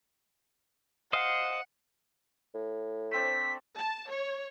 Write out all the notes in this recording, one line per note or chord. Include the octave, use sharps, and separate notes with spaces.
C5 D#5 F5 F#5
A2
A3 C4 D4 B6
A5
C#5